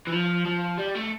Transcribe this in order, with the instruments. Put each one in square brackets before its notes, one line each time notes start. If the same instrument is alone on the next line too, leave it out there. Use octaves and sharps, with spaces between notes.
[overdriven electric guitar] E3
F3
F3
G3
A3